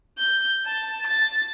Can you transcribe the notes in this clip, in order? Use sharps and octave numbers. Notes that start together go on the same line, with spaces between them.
G6
A5
A6